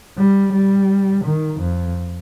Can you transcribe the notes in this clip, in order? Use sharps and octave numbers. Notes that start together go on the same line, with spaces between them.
G3
G3
D#3
F2